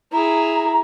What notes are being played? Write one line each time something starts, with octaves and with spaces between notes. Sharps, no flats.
E4 G#4 A#5